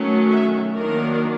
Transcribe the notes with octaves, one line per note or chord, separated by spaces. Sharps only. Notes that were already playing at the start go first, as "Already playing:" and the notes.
Already playing: D#3 F#3 A3 C#4
E5
D#3 F#3 A#3 D4 A#4